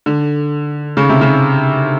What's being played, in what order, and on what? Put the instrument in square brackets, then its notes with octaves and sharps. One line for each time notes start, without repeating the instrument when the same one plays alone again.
[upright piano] D3
C#3
C3
C#3